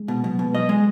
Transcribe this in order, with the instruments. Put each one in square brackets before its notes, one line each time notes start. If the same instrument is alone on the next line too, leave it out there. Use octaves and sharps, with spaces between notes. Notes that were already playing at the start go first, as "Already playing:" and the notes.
Already playing: [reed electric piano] G#3
[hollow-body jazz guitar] B2
[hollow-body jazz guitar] B2 [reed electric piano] F#3
[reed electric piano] F#3
[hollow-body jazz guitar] B2
[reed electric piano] G#3
[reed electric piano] F#3 [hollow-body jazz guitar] D#5
[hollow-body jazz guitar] G#3